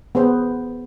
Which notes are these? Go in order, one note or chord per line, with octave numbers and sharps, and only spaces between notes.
B3 G#4 C5